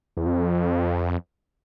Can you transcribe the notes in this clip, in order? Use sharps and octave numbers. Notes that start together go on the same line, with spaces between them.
E2
F2